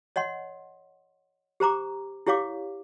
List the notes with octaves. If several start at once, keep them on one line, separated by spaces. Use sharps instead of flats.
C#5 D#5 F#5 C6
G4 C5 A#5 D6
E4 G4 C#5 F5 D6